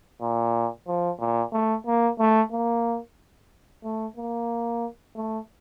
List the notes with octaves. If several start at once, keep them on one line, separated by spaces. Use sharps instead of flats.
A#2
F3
A#2
A3
A#3
A3
A#3
A3
A#3
A3